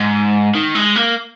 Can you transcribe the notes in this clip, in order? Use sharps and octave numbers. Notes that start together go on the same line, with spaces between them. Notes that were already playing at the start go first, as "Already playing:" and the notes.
Already playing: G#2
D#3
G#3
A#3